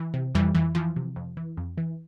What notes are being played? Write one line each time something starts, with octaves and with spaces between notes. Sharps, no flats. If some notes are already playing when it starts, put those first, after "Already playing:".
Already playing: E3
C3
F2 E3 G3
F2 E3
E3 F3
C3
F2
E3
F2
E3